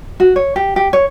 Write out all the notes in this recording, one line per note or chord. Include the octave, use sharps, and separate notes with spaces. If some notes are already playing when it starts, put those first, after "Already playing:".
F#4
C#5
G4
G4
C#5